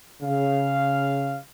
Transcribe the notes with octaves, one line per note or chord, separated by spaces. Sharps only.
C#3 F5